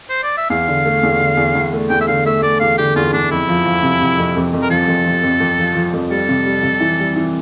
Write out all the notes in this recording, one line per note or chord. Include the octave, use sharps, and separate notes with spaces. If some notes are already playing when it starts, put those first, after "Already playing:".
C5
D5
E5
E2 F5
D3
A3
E2
D3
E2
E2
A3
E2 G5
E5
D3 F5
A3 E5
A3 D5
E2 F5
D3 G4
E2 F4
E2 D4
F2 E4
F3
F3
C3
C3
F2
F2
F2
A#4
F3 A4
F2
F3
F2
F2
F3
F3
F2
G3 A4
C3
G3
C3
E3
G3
E3